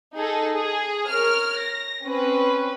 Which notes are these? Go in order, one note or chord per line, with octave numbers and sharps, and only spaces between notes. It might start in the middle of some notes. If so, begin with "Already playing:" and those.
D#4 G#4 A4
G#4
A#4 C#5 F6
A#6
C4 C#4 B4